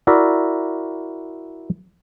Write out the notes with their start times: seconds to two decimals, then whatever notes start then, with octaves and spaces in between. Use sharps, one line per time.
0.07 E4 F#4 A#4 D5 E5